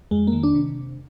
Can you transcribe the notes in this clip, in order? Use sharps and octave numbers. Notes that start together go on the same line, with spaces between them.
F2 G#3
A#3
D#3
D4
C3